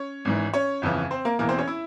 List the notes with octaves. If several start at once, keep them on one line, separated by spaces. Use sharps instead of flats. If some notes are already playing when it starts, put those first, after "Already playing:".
Already playing: C#4 C#5
G#1 G#2 E3
C#4 C#5
G1 F2 C#3 E3
C4 C5
A#3 A#4
E1 E2 E3 A#3 A#4
C4 C5
C#4 C#5
E4 E5